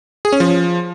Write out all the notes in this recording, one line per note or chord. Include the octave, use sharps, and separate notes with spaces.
G#4
C#4
F3